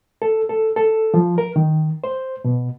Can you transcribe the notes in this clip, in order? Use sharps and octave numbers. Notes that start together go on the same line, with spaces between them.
A4
A4
A4
F3
A#4
D#3
C5
B2